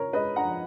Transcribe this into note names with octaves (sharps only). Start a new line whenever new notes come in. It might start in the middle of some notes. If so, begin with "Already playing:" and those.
Already playing: C#3 A#4 C#5
G#3 B4 D#5
F#5 A#5
F3